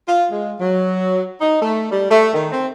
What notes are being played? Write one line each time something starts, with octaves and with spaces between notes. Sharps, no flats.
F4
G#3
F#3
D#4
A3
G3
A3
D#3
C4